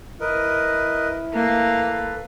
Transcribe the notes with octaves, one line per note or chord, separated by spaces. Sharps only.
E4 A#4 B4 D#5
A#3 A4 B4